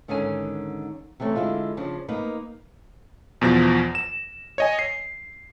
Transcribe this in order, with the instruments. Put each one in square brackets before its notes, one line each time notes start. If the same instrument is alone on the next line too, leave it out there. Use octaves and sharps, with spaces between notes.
[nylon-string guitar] G#2 D3 D#3 C#4 G#4 G#5
C3 E3 A3 C4 C#4
D3 G#3 E4 F4
C#3 F3 D4
A#3 B3 D#4 B4
[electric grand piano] E2 B2 F3 A#6
E7
C#5 D#5 G#5
C7